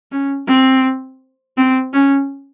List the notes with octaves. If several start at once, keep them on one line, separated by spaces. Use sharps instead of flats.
C#4
C4
C4
C#4